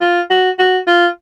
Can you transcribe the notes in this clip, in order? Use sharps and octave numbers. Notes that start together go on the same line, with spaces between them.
F4
F#4
F#4
F4